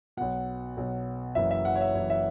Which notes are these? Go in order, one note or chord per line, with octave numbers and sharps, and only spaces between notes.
B1 B2 F#5
B1 B2
F#1 F#2 E3 E5
E5
F#5
C#5
E5
F#1 F#2 E3 C#5
E5